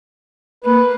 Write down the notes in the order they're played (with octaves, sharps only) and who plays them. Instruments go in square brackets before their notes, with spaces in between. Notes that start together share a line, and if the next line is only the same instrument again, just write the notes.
[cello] A#3 [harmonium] B4